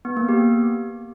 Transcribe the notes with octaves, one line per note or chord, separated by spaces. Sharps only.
B3
A#3
G4